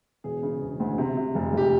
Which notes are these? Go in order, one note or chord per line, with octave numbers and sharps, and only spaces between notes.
E1 G#4
C#3
E1
D2
C3
C3
F1
F1 G4